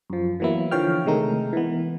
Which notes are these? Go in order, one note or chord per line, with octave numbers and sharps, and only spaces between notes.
F#2 F3
E3 F#3 A#3 B3 E4
D3 E3 F3 C#5 G5 F6
C3 D#3 G#3 A3 D#4 A#4
E3 B3